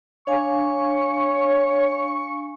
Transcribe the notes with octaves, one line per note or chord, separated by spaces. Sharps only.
D4 C#5 F5 G#5 C#6